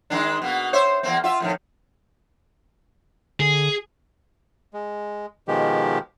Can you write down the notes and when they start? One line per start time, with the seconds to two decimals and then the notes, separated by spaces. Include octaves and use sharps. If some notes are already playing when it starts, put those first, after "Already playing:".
0.10 D#3 G#3 D4
0.42 B2 A#3
0.73 C5 C#5 E5
1.03 E2 A#3 C4
1.24 F4 E5
1.40 F2 A2 D#3
3.40 D3 G#4
4.73 G#3
5.48 B2 D#3 F3 G#3 G4